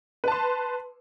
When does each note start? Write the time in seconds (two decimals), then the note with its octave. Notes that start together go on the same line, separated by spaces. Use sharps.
0.24 B4
0.28 A5
0.32 C6